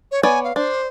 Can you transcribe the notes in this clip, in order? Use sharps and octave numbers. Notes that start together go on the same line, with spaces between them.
C#5
B3 C#5 D5 G#5
F5
D4 C5